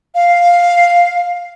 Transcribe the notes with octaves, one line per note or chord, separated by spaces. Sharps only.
F5